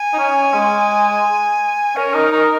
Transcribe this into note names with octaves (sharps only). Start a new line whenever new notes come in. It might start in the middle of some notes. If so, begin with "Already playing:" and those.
Already playing: G#5
D#4
C#4
G#3
C#4 A#4
D#4
D#4